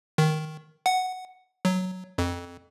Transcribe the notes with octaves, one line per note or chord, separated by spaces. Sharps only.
D#3
F#5
F#3
F2